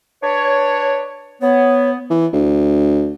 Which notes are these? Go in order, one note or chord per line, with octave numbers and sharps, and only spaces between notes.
D4 B4 C#5
B3 C#5
E3
D2